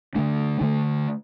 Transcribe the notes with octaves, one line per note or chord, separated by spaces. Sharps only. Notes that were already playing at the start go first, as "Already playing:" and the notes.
D3 A3 D4
D3 A3